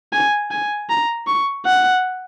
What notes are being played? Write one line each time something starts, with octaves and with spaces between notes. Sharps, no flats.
G#5
G#5
A#5
C#6
F#5